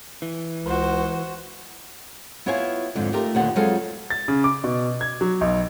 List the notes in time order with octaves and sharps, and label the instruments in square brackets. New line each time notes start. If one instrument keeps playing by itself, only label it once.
[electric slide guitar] E3
[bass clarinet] C#2 [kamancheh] F#4 C5
[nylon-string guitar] B3 E4 F4 C#5 F5 G#5
F2 G#2 D3
A3 D#4 F4 G4 A#4
D#2 A#2 D3 B3 F#5
F2 F#3 G#3 G#4 A4 F5
[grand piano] A6
C#3
D6
B2
G#6
F#3
B1